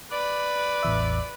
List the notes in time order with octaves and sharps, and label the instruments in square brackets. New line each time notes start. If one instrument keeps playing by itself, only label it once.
[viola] B4 [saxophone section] D5
[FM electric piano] A1 E2 E5